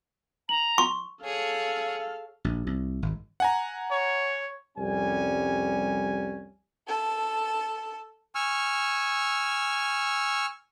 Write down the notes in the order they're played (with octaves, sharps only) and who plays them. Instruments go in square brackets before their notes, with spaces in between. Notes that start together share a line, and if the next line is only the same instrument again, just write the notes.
[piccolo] A#5 [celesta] F#7
[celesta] C6 [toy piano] C#6
[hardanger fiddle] G#4 C#5 [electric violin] A4 F5
[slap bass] A#1
C2
G#1
[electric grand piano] F#5 G#5 A#5
[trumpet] C#5
[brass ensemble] C2 F2 G3 C#4 G#5
[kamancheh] A4 A5
[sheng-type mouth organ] G#5 C#6 E6 F6